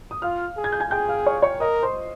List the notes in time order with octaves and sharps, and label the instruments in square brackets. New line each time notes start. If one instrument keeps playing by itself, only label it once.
[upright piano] D#6
[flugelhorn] F4 [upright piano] F5 F6
[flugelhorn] G#4
[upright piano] G#6
G6
G#5 G#6
[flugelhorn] G#4 [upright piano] G5 G6
[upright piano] F5 F6
C#5 C#6
C#5 C#6
[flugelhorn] A#4 [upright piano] D#5 D#6
[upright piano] C5 C6